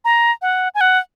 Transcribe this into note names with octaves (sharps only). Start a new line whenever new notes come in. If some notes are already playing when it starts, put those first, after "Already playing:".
A#5
F#5
G#5
F#5